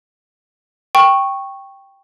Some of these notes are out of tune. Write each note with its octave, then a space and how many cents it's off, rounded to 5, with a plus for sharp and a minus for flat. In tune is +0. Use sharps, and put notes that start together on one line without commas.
G5 +0 C#6 -10